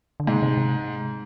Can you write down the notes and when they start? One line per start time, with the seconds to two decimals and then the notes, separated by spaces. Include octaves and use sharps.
0.20 D3
0.27 G#2 C3 G#3
0.43 C3
0.57 C3